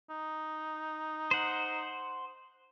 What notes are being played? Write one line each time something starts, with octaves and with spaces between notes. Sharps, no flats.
D#4
C5 F#5